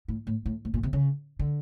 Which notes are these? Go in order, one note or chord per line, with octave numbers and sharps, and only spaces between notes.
A2
A2
A2
A2
A#2
C3
C#3
D3